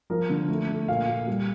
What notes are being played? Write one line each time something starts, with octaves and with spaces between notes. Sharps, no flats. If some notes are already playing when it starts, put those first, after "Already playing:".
F3 A#4
D3
A3
A3
A#2 F5
A#2
G3